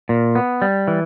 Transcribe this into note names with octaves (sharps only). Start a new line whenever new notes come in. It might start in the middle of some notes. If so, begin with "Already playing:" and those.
A#2
B3
G3
E3